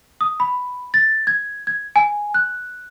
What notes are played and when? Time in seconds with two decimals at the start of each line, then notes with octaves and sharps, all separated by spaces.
0.21 D#6
0.40 B5
0.94 A6
1.27 G#6
1.67 G#6
1.96 G#5
2.34 F#6